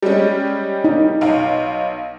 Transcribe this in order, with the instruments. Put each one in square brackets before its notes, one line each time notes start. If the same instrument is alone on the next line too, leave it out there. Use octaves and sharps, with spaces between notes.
[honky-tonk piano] G3 G#3 C#4
[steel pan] D#4
[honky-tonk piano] B1 F5